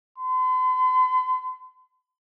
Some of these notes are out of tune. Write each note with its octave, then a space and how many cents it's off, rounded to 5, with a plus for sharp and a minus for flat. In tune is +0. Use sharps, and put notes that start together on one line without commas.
C6 -45